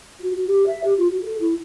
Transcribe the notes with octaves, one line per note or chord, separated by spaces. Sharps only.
F#4
F#4
G4
E5
G4
F4
F#4
A4
E4